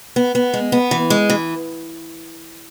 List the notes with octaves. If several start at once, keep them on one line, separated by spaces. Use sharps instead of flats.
B3
B3
G#3
B3
E3
G#3
E3